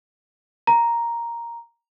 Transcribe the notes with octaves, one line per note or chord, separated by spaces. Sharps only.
A#5